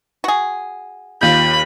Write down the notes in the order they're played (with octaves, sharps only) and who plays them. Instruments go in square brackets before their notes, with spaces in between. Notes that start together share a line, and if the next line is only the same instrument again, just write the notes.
[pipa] F#4 G#4
[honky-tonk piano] D#2 F4 G6 [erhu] B5